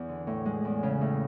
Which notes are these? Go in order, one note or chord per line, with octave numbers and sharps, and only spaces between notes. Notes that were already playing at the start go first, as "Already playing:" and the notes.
Already playing: E2
D3
A2
G#3
E2
C#3
A2